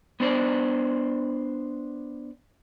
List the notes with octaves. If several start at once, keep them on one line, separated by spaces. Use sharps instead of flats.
B3 D4 C5 D5